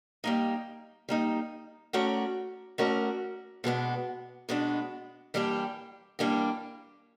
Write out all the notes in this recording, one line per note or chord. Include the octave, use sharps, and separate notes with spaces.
G3 A#3 D#4
G3 A#3 D#4
A3 C#4 F#4 A#4 D5
A3 C#4 F#4 A#4 D5
B2 G#3 B3 D4
B2 G#3 B3 D4
E3 G3 A#3 D4 G4
E3 G3 A#3 D4 G4